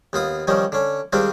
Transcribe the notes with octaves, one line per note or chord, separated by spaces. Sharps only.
D#2 B3 F4 D#6
D#3 F3 G3 C#4 D#4
D3 C#4
G#2 D#3 G3 C4 D4 F4